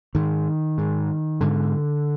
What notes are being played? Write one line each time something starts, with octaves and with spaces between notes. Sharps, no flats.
G#2 D#3
G#2
G#2 D3